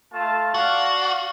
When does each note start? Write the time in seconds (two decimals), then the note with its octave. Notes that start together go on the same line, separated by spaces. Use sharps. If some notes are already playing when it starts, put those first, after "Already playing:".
0.13 A3 F4 A5
0.54 F#4 D5 F5 F#5